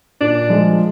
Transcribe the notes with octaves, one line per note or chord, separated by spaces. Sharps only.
A#2 D4
F3 G#3